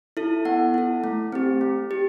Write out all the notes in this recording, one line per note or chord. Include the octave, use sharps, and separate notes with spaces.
E4 A4
B3 F#5
E4 A4
A3
C4 G4
A3
G4